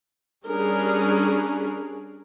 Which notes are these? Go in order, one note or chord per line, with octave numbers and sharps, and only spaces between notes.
G3 C#4 D4 G#4 A#4